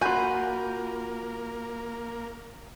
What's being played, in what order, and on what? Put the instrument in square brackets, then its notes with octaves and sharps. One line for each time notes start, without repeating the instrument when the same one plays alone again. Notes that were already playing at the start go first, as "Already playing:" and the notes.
[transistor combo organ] A#3 [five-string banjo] F4 G#5 [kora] F#4 [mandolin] B5 G6